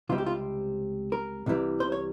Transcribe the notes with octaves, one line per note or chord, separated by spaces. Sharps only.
C#2 C3 G3 C4 F4
G4
F4
A#4
C2 C3 E3 G3
C5
C#5